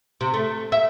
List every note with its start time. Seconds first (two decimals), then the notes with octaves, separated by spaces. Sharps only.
0.21 C3
0.34 A3
0.72 E5